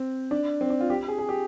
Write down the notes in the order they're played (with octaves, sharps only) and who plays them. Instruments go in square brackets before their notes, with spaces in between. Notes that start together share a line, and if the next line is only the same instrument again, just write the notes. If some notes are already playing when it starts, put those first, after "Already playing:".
Already playing: [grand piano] C4
D4
C4
D4
F4
G4
G#4
G#4
G4